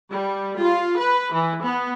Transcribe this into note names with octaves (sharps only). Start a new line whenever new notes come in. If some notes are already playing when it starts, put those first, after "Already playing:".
G3
F4
B4
E3
B3